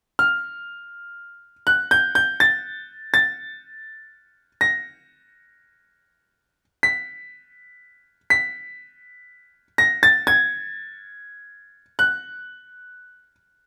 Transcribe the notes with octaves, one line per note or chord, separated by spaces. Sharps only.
F6
F#6
G6
G6
A6
A6
A#6
B6
B6
A#6
A6
G#6
F#6